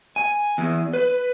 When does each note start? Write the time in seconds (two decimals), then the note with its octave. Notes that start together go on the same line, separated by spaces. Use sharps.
0.16 G#5
0.58 E2
0.93 B4